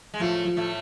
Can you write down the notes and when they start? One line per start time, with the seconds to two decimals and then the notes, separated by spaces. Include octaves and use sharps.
0.14 G#3
0.20 A2 F3 A3
0.45 F3
0.57 A2 A3